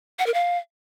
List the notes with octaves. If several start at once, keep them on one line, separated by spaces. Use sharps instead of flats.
F#5
A#4
F5